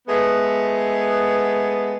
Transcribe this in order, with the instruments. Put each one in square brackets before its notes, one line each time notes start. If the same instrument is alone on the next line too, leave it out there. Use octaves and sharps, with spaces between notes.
[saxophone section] G#3 A3 B3